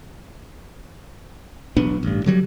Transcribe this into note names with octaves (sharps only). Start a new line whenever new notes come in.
E1 B1 B3 D4
A1 G2
D3 F#3 G3